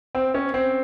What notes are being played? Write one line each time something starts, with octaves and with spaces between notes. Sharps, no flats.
C4
C#4
C4